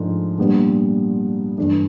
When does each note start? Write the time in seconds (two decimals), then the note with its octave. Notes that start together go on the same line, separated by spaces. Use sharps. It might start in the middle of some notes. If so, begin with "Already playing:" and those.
Already playing: G#2 F3 A3 D4
0.38 A#2 G3 B3 D4
1.58 G2 E3 A3 D4